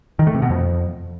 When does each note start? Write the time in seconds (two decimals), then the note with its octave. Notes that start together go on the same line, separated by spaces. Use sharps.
0.19 D#3
0.27 A3
0.34 C3
0.42 B2
0.50 F2